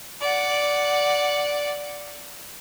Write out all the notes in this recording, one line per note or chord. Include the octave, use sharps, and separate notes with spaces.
D5 F#5